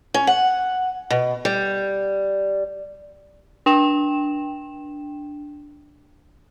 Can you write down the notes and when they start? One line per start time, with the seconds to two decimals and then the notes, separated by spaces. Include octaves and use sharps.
0.14 C#4
0.27 F#5
1.10 B2
1.45 G3
3.66 D4 G5 E7